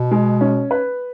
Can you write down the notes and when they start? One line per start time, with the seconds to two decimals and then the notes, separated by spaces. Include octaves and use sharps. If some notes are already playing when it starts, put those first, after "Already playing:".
Already playing: B2
0.11 G#3
0.41 C#4
0.71 B4